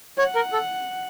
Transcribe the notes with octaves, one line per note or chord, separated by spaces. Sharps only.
C#5 F#5
A#4
A4